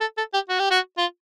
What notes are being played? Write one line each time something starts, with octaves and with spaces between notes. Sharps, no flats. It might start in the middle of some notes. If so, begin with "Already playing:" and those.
A4
A4
G4
F#4
G4
F#4
F4